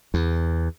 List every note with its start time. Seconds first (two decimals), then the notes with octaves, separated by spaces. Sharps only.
0.14 E2